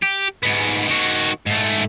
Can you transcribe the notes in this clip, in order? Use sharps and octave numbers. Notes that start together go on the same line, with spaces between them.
G4
G#2 B3
D#3 F#4
G#2 A3